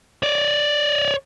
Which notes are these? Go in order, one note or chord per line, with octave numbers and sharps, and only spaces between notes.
C#5 D5